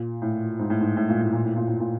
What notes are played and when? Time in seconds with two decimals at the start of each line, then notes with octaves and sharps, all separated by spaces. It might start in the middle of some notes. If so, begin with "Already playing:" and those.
Already playing: A#2
0.22 A2
0.59 G#2
0.70 A2
0.80 G#2
0.97 A2
1.09 A#2
1.21 A2
1.32 A#2
1.45 A2
1.56 A#2
1.68 A2
1.80 A#2